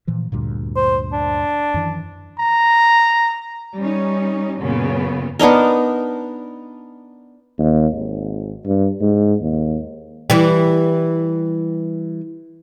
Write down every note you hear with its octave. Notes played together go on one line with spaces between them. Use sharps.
A#2 E3 F3
D2 G2 A#2
C5
D4
F#2 D#3 E3
A#5
G3 C#4 D#4
F#2 A#2 C#3 B3
B3 D4 D#4 A#4
D#2
G#1
G2
G#2
D#2
E3 G3